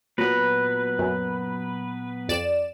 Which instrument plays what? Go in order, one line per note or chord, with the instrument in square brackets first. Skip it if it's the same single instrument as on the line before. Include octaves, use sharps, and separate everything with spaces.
[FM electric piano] A#2 F#3 A#5 [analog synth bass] B3 [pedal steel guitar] B4
[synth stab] F#2
F2 D5 E7